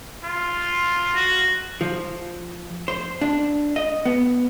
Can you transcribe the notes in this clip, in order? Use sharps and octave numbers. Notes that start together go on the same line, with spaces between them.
F4
F#4
F3
C5
D4
D#5
B3